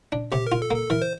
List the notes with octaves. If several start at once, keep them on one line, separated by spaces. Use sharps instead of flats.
D4
C3 G4
A#4
F4
A4
A#3
A4
E3 A#4
C5